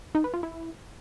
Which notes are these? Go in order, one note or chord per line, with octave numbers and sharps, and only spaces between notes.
D#4
B4
F4
E4